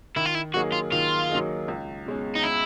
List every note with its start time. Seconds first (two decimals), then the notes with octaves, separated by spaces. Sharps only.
0.16 D#3 E4
0.25 F4
0.35 E4
0.54 F#3 A#3 D#4 F#4 G#4
0.72 F4
0.92 D#3 F4
1.30 F#3 A#3 D#4 G#4
1.68 C#2
2.06 B2 G#3 C#4
2.36 D#4
2.44 E4